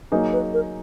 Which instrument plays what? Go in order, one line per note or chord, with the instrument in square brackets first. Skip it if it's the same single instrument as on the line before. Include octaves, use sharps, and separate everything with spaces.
[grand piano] F#3 A#3 D#4 G#4
[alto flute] B4
A#4